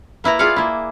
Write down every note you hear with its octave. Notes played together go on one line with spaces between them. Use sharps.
A#3 E4 B4 A#5
F4 G#4 B4 D5 F5 F#5
A#3 E4